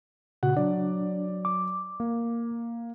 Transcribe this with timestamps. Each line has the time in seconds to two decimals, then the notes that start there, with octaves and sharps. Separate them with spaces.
0.43 A#2 C#3 F#4 F#5
0.57 F#3 D4 D5
1.45 D6
2.00 A#3